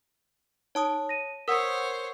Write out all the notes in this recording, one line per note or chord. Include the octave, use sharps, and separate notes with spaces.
D#4 C#5 A5 D#6
A#6 D#7
A#4 C5 C#5 F#5 D#6 E6 B6